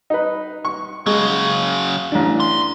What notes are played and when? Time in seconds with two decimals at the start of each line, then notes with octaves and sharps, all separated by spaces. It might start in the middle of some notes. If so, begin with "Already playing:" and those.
0.10 D#4 B4
0.65 C#6
1.06 C#3 F#3 G#3
2.12 A1 D4
2.40 C6